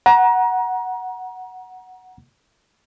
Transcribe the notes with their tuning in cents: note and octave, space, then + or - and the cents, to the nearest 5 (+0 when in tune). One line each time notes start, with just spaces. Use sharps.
F#5 +0 A#5 +30